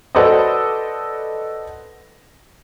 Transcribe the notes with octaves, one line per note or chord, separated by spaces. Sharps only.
F#4 A4 B4 C5 D5 D#5